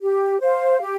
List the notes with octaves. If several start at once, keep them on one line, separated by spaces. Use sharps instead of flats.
G4
C5 F5
G4